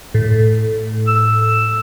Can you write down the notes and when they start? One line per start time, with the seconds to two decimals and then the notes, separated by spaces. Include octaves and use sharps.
0.14 A2
1.07 E6